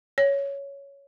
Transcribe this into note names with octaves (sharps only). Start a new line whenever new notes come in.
C#5